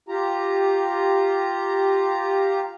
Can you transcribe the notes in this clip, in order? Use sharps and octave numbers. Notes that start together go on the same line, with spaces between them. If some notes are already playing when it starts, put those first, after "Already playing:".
F4 G4 A#5